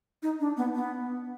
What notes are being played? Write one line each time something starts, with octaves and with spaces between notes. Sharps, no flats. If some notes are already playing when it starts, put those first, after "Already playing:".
D#4
D4
B3
B3